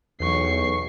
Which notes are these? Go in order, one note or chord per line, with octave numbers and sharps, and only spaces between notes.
B1 E2 C#6 C7